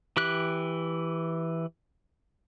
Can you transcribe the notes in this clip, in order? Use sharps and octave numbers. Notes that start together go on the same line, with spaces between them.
E3 G4 F#6